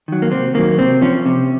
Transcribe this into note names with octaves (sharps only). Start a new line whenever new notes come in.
D#3 F#3
A#3
C3 C4
D#3 F#3 A#3
C3 C4
F3 C#4
C3